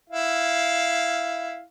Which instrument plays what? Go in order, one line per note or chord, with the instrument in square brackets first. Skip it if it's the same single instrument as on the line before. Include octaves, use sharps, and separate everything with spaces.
[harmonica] E4 F5